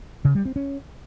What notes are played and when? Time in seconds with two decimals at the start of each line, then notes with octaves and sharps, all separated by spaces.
0.25 C#3
0.35 G3
0.45 C4
0.56 C#4